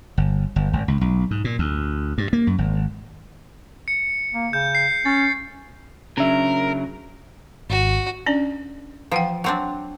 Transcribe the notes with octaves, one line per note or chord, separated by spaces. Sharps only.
G1
G1
G#1
C#2
B1
G#2
A#2
D2
G2
A#3
F#2
G#1
C#7
A#3
C#3 G6
C7
C#4 A6
C#3 F#3 C#4 D4 A#4 E5
G#1 F#4
C#4 D4 D5
E3 F3 F#5 G5
F#3 C4 D4